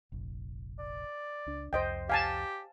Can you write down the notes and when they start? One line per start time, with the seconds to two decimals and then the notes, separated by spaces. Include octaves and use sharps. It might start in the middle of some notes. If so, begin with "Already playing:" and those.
0.12 F1 A#1
0.79 D5
1.46 C#2 D4
1.73 C2 F2 C5 D#5 G5
2.09 G4 F5 G#5 A5